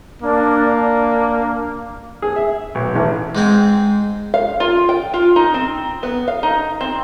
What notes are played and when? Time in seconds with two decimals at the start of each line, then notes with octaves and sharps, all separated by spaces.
0.22 A#3 D4
0.64 D4
2.22 G#4
2.36 E5
2.75 B1
2.96 A1
3.35 G#2 G#3 C4
4.34 F5
4.60 F4
4.89 G5
5.14 F4
5.36 D#4
5.54 C4
6.03 B3
6.28 F5
6.43 D#4
6.81 C4